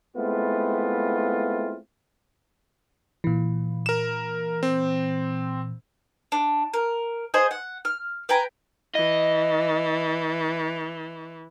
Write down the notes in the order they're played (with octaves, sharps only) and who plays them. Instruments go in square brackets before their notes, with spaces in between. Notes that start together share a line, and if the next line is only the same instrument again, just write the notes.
[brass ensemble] G#3 A3 B3 C4 E4 F4
[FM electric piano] A#2 E3
[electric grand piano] A#4 E7
C4
[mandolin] D4
A#4
G#4 C5 D#5
F#5
F6
B4 G5 G#5 A#5
[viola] E3 [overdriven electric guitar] D#5